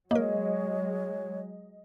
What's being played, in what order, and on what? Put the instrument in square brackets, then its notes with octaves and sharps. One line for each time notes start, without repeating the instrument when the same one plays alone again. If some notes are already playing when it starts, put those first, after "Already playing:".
[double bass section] F#3 G#3 [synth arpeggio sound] A#3 A#4 [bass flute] C#5 [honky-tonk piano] D#5